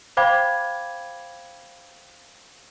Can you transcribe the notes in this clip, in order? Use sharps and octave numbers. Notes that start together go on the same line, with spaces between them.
C5 F5 G5 B5 D6 G#6